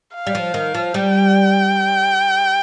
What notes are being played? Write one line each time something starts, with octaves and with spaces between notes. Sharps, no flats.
F5
G3
F3
D#3
F3
G3 G5